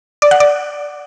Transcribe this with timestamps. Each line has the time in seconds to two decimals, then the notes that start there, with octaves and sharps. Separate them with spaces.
0.22 D5
0.31 F#5
0.40 D5